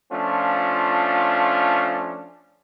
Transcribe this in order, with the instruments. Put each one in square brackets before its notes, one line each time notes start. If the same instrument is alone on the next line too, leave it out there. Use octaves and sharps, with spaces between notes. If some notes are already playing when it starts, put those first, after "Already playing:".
[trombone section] F3 A3 C#4 D4 F4